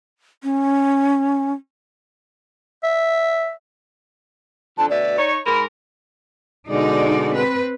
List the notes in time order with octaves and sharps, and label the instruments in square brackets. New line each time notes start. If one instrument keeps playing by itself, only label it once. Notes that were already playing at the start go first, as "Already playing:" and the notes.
[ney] C#4
[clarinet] E5
[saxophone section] F2 D3 D4 [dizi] A5
[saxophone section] D2 B2 E5 [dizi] D5
[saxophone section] D#4 C#5
[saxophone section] G#2 A#4 [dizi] B5
[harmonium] B2 D3 G#3 [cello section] D#4 D5
[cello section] C4 B4